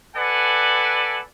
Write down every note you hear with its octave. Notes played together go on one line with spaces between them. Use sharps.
A4 B4 D5 F#5 G#5